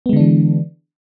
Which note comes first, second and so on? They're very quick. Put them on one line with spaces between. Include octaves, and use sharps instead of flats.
B3 G#3 D3 D4 E3